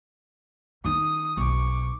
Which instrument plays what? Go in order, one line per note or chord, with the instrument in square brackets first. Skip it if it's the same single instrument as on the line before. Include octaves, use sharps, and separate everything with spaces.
[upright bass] D#3 D#4 [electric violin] D#6
[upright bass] B1 [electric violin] C#6 D6